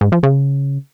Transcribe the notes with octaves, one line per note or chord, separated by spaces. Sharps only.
G#2
F3
C#3